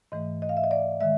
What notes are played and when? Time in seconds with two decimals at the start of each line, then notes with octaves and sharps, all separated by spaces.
0.12 G#2 E3 A3 D#5
0.42 D#5
0.49 F5
0.57 E5
0.64 D#5
0.71 D5
1.01 D#3 G#3 E5